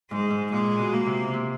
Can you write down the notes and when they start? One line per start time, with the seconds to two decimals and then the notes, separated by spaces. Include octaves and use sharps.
0.11 G#2 G#3
0.30 G#2
0.52 A#2 G#3
0.79 B2
0.93 A#3
1.06 C3
1.34 C3